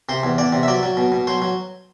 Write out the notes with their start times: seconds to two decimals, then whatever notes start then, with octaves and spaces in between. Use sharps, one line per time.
0.09 C3 C5
0.23 E2
0.38 E2 D5
0.52 C3
0.63 E5
0.68 F#3 D5
0.83 F#3
0.97 B2
1.12 B2
1.27 F#3 C5
1.42 F#3